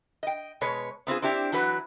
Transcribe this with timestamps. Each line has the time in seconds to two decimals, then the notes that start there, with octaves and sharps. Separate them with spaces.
0.23 D#5 G5
0.61 B2 G#3 B4 C#5
1.07 B3 C4 F4 G#4
1.22 C4 D4 E4 G4
1.52 E3 F#3 F#4 B4